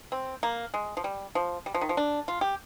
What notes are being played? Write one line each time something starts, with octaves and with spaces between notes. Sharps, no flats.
C4
A#3
G#3
F3
G3
F3
G3
F3
D#3
F3
D4
F4
G4